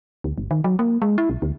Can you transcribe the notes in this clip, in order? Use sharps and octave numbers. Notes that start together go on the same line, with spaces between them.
D2
G1
D#3
F#3
A#3
G#3
E4
B1
D2